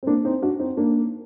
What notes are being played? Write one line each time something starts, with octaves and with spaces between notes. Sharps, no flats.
C4
A#3 D4
C4 D#4
D4 F#4
C4 D#4
A#3 D4